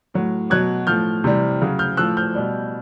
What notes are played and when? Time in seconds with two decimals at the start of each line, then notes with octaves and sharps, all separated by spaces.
0.14 A2 F#3
0.50 B2 F#3 F#6 G#6
0.87 A2 F3 F6 G6
1.24 C3 E3 G3
1.61 C#3 F#3
1.79 F6 G6
1.97 A2 F3 E6 F#6
2.17 F6 G6
2.35 B2 G3